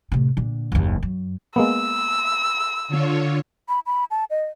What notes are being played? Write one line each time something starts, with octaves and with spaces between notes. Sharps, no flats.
A2 C3
A#2 D3
F#1 D#2
F#2
G#3 A#3 B3 E6
D3 F4 C#5
B5
B5
A5
D#5